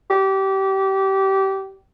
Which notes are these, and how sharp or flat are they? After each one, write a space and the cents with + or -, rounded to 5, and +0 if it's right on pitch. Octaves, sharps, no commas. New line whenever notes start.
G4 -25